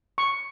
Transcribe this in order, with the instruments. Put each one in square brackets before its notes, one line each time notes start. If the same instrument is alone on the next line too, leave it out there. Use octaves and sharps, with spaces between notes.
[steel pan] C#6